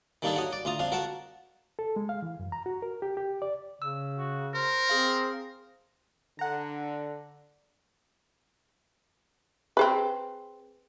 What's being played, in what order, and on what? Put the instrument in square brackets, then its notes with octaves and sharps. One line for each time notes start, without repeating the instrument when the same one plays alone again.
[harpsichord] D#3 G3 A#3 D4 D#4 A4
F#4 C#5 D#5
D5
D2 F4 A#5 D#6
F2 D4 F5
F#4 A#4 F#5 A5
[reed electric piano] A4
G#3
F5
E3
F#2
A#5
F#4
A#4
G4
G4
D5
[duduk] C#3 [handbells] E6
[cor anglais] F#4
[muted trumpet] A#4 [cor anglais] C5
[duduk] C4 [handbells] G#4 F5
[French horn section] D3 [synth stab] F#5 A#5
[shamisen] C4 G#4 B4